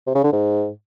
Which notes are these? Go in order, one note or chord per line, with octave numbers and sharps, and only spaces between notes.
C3
C#3
D3
G#2